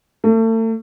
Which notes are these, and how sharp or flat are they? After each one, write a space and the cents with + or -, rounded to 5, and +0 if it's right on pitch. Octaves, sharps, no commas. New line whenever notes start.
A3 +35